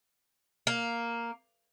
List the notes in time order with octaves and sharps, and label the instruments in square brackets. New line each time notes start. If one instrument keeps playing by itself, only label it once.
[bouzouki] A#3